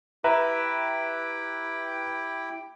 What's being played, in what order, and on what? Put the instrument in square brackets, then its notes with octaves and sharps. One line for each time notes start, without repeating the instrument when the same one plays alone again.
[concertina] E4 G4 G5 [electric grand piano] B4 E5 A#5